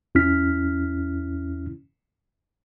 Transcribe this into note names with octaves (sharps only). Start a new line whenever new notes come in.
E2 C#4 E4 F6 B6